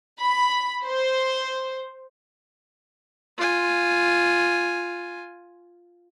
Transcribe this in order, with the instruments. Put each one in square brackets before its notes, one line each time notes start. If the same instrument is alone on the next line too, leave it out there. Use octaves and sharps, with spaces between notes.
[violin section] B5
C5
[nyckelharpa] F4 G#5